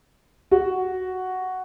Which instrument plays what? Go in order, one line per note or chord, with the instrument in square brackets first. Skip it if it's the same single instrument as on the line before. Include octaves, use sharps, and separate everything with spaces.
[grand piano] F#4